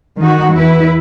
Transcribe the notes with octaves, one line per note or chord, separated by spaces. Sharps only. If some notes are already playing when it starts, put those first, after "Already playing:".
D#3 D#4 F#4
E2 E4 B4